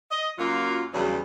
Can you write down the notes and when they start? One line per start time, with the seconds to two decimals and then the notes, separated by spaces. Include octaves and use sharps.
0.10 D#5
0.38 F#2 F#3 A#3 F4
0.93 E2 G2 C#3 F#3 G3